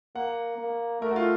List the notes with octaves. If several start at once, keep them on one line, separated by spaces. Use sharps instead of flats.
A#3 F#5
A#3
A3 A#4
F#4
F4